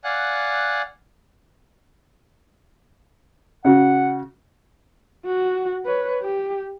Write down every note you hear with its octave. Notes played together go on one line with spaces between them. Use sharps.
D5 F5 F#5 G#5 F#6
C#3 F#4 F#5
F#4
B4 C#5
G4